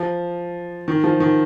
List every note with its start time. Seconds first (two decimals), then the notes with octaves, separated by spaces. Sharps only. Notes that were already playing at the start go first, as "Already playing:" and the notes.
Already playing: F3
0.88 D#3
1.04 F3
1.20 D#3